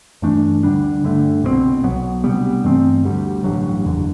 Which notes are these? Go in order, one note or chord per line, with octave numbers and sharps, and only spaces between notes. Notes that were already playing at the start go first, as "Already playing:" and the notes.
G2 E3 A3 D4
D2 D3 G3 D4
G2 D3 A3
C2 B2 G3 C4
B1 B2 F#3 B3
D2 C3 G3 B3
G2 E3 A3 C4
D2 D3 G3
A1 G2 F#3
F#1 E2 D3